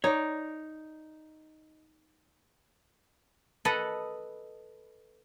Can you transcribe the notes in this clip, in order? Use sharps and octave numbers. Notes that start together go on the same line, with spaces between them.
D#4 C#5 D5
A4 B4 D#5 F#5 A5